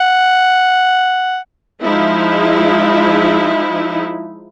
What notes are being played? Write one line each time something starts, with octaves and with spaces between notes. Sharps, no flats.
F#5
F3 G#3 D#4 E4